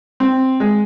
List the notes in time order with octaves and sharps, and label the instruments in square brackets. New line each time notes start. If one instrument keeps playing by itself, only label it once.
[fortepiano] C4
G#3